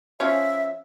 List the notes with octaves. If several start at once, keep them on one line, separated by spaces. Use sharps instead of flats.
F3 C#4 C#5 E5